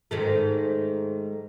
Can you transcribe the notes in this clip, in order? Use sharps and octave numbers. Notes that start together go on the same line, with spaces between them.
G#2 D#3 A3